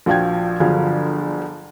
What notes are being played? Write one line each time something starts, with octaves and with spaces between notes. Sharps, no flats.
A#1 F3 F#4 F5 G5 G#6
G1 D3 F3 F#3 G#4 F5